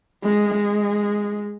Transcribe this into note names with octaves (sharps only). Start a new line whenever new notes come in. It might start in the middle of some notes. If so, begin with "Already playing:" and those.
G#3
G#3